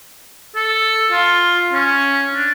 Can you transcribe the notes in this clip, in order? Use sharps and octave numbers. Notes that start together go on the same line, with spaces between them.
A4
F4
C#4
D4